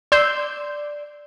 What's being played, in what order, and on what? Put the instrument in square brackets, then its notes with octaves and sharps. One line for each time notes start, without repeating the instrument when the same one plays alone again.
[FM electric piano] D5 [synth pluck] C6 E6 G6